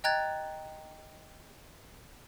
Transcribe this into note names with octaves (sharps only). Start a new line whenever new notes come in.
D#5 G5 A#5 F#6 G#6 A6